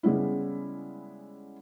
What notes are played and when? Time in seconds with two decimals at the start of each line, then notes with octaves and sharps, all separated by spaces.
0.03 C#3 G3 G#3 B3 C#4 E4